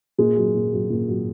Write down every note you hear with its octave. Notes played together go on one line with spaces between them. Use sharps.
A#2 G#3
F#3
A#2
F#3
A#2
F#3